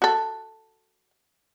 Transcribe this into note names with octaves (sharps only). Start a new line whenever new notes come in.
F#4 A4